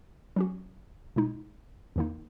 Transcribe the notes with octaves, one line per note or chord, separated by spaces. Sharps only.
F#3 C#4 F#4
B2 G#3 D#4
E2 D#3 A#3 D#4